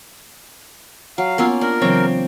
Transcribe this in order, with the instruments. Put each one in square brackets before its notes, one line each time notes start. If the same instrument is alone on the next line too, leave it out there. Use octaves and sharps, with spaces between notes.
[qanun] F#3 [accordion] F5
[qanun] A#3 C#4 F4 [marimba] B3 E6
[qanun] D4 [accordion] A#4
[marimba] C#3 E3 F#3 [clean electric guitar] C4 C#5 [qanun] G5